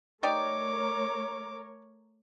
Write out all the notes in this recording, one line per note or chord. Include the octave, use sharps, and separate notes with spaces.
A3 D#4 G4 A#4 C#5 D5 D6